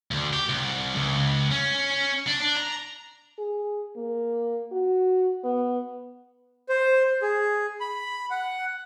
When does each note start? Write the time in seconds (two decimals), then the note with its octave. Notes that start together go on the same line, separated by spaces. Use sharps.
0.11 D2
0.33 G4
0.49 C2
0.95 C#2
1.51 C#4
2.28 D4
2.42 D4
2.57 A#5
3.38 G#4
3.96 A#3
4.72 F#4
5.44 B3
6.69 C5
7.22 G#4
7.80 B5
8.31 F#5